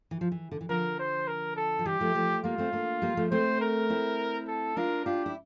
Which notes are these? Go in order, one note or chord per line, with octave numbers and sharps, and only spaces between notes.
E3
F3
E3
D3
E3
D3 F3 A#4
C5
A#4
A4
F3
E3 G3 G4
F3 A3
F3 A3
G3 A#3 F4
A3 C4
A#3 D4
G3 A#3
F3 A3
A3 C4 C5
A#4
C4 E4
A4
D4 F4 A#4
D4 F4 G4
E4